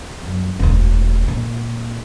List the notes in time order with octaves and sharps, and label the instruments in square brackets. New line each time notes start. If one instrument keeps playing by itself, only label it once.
[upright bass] F#2
E1 D2
A#2